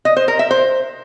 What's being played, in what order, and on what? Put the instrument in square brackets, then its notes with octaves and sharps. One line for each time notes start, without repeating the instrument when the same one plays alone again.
[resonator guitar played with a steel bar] D#5
C5
A#4
E5
C5